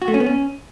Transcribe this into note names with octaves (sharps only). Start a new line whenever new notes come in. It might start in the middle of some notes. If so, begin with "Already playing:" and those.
F#4
A3
C#4
B3
C#4